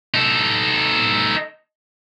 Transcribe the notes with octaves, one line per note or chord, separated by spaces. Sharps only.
D#4 A4